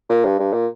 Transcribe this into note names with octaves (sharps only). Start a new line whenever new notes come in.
A#2
G2
G2
A#2